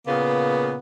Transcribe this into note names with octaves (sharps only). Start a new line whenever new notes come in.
A#2 C#3 A#3 B3